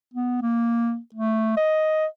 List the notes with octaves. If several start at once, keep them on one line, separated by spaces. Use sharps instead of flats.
B3
A#3
A3
D#5